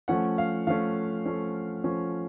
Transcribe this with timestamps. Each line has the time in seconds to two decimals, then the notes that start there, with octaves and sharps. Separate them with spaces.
0.08 F3 A3 C#4 F#5
0.38 F5
0.67 F3 A3 C#4 F5
1.26 F3 A3 C#4
1.84 F3 A3 C#4